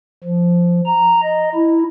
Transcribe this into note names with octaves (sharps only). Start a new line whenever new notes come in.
F3
A#5
D#5
E4